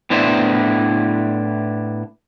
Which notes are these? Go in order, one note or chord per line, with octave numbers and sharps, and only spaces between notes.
A2 B3 D4 E4 C5